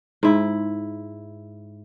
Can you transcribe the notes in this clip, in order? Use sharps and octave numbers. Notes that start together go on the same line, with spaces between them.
G#2 E4